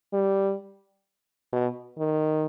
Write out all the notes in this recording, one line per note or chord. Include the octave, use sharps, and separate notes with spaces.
G3
B2
D#3